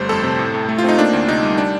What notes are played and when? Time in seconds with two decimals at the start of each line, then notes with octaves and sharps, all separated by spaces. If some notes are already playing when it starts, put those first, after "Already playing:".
Already playing: G1 G3 A3 C5
0.09 F2 A4
0.24 C3
0.39 A2
0.54 A2
0.69 A3
0.78 F4
0.84 C4 D#4
0.98 A#3 D4
1.13 D2
1.28 C3 D#4
1.43 G3
1.58 D4